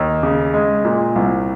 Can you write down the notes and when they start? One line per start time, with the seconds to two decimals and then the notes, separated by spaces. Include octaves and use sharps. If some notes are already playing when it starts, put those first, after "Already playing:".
Already playing: D#2
0.23 C#3
0.54 G#3
0.85 A#2
1.16 C2